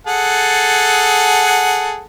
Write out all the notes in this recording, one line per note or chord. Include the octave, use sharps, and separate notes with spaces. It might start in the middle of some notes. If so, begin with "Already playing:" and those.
G#4 A4 F#5